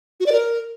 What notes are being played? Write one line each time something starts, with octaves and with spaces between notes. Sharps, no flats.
F#4
D5
A#4